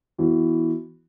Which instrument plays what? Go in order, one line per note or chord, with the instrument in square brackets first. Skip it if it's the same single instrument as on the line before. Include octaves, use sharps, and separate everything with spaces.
[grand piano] E3 B3 F#4